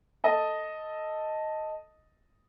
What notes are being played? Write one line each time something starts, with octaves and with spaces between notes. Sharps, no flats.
A4 D#5 A5